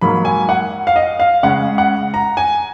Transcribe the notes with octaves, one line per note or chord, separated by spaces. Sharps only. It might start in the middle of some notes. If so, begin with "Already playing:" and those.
G#2 F#3 A#3 B5
G#5
F#5
F5
D#5
F5
C#3 G#3 C#4 F#5
F#5
A#5
G#5